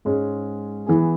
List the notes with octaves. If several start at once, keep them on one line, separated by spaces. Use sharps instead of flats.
G#2 G#3 C#4
E3 B3 G#4